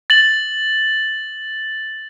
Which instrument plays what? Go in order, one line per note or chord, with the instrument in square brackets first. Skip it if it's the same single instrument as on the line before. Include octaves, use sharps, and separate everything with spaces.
[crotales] A6 F#7